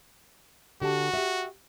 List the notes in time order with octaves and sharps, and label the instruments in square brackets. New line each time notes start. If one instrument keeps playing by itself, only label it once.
[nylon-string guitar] D3 G4 A5 [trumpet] F#4
[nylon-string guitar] G4 E5